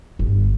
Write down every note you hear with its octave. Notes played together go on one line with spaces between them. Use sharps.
G1